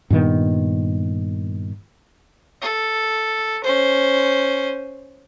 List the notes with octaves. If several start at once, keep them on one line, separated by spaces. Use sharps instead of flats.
G2 A#2 D#3 B3
A4
C#4 C5